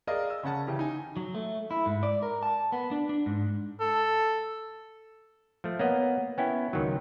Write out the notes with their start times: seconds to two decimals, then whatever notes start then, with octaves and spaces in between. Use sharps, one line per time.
0.07 G#4 A#4 D5 D#5 F5
0.30 E6
0.43 C#3 C#4 F#5 A5
0.67 C#3 E3 G4
0.79 D#4 G#5
1.17 F#3
1.35 A3
1.71 E4
1.86 G#2
2.03 D5
2.23 A#4
2.43 A5
2.72 B3
2.91 D4
3.09 D4
3.26 G#2
3.80 A4
5.64 F3 A3
5.79 A#3 B3 C#5 D#5 F#5
6.38 B3 C#4 E4 G5
6.73 C#2 D#3 F#3